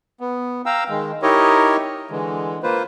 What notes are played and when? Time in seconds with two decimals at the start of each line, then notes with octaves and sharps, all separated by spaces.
0.21 B3
0.66 F5 G5 A#5 E6
0.89 D#3 G#3
1.22 D#4 E4 G4 A#4 C#5 D#5
2.11 D3 E3 G#3
2.63 A#3 F4 B4 C5